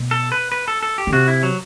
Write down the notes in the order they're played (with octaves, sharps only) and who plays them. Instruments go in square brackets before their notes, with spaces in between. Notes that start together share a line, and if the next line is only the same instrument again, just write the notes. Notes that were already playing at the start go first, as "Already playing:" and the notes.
Already playing: [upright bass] B2
[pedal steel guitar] A4
B4
B4
A4
A4
G4
[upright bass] D3
[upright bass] C3 [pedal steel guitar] F#4
[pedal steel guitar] E4
F#3